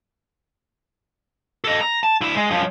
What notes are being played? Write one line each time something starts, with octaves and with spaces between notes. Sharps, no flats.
A4 D#5
A#5
A5
D2 E4
G#3
F#2 F3